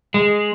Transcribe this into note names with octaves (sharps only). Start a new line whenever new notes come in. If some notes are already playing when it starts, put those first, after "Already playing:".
G#3